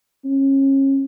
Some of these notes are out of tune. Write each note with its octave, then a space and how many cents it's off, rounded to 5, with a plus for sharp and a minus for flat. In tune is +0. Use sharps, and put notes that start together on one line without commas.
C#4 -30